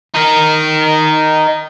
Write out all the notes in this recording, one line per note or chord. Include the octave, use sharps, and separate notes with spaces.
D#4 A#4